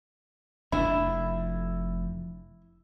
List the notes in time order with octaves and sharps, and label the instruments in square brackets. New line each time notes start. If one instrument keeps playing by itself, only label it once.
[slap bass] F1 F2 D4 [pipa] E4